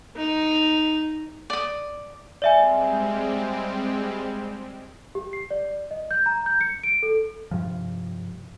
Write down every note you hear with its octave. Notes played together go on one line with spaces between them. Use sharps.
D#4
D5 D#6
G3 G#3 C4 D5 E5 G#5
G4
C7
D5
D#5
G6
A#5
G6
C#7
D7
A4
G2 C3 F3